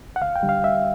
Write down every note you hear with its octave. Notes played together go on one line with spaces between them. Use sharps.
F#5
D2 F5
G5
D3 G3
F5
D2 E5